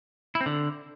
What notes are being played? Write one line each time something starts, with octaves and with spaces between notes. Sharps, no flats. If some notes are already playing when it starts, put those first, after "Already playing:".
E4
C4
D3